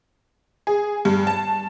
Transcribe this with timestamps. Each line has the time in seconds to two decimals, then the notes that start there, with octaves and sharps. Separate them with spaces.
0.67 G#4
1.05 G2
1.27 A5